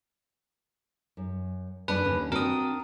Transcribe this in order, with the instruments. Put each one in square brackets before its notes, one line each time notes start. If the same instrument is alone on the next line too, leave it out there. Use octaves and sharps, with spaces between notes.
[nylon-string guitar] F#2
[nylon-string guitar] F#2 D4 A5 [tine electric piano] B4
[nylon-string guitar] D#2 D3 C#4
[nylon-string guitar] C4 D4 F#4 [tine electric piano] A#4 D#6